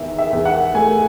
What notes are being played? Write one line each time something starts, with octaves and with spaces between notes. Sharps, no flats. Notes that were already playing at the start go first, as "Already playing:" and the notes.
Already playing: E2 D#3 D#4 E5
E5
E2
F#5
A3 G#5